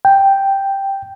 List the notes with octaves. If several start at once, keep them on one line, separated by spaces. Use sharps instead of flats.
G5